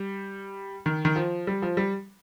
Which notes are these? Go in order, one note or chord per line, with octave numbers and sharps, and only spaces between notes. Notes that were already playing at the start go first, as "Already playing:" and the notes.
Already playing: G3
D#3
D#3
F3
G3
F3
G3